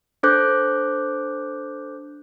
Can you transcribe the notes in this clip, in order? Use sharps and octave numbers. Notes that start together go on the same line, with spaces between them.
D4 A4 C5 D6 F#6 G6